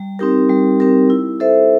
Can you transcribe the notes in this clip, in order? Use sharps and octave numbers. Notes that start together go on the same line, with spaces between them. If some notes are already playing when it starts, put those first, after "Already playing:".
Already playing: G3
C4 D#4 G4 A#4
G3
C4 D#4 G4 A#4
E4
A4 C5 E5